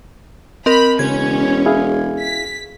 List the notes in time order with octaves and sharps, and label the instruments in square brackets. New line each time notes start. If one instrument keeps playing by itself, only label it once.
[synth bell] C4 A#4 [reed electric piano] D#5 [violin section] B5
[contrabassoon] E1 [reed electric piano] C#3 [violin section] C#4 [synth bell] G#6
[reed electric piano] E4 G#4 F5
[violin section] B6